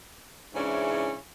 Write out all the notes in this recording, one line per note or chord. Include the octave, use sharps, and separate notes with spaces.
G#2 C#3 E3 C#4 D4 E4